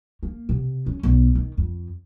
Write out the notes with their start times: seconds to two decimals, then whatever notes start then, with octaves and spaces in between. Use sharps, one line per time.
0.23 A#3
0.49 C3
0.86 C#4
1.03 B1
1.35 D#3
1.57 F2